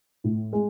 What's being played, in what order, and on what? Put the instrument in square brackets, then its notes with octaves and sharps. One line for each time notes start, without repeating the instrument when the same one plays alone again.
[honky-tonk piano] A2
G#3